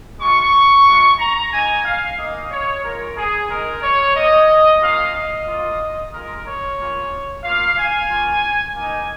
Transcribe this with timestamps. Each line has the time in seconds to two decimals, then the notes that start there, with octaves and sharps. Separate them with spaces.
0.20 G#3 F4 C#6
0.86 G#3 F4
1.19 A#5
1.51 A#3 D#4 G#5
1.84 F5
2.17 A#3 D#4 D#5
2.51 C#5
2.83 G#3 F4 A#4
3.16 G#4
3.49 G#3 D#4 A#4
3.82 C#5
4.15 A#3 D#4 D#5
4.80 A#3 C#4 F4 F5
5.13 D#5
5.46 A#3 F4
6.12 G#3 F4 A#4
6.45 C#5
6.78 A#3 C#4 F4
7.43 A#3 F4 F5
7.77 G#5
8.10 A#3 C#4 F4
8.75 A#3 D#4 G#5